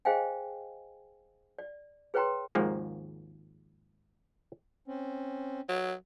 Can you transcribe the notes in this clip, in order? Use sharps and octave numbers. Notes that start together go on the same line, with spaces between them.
G#4 C5 D#5 F5 G5 G#5
D5
G#4 B4 C#5 G5 A#5 C6
G#1 D#2 G#2 F3 A#3
C4 C#4
F#3